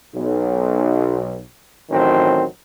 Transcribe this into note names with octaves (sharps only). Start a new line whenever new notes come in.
B1
A1 D#3 F#3 C4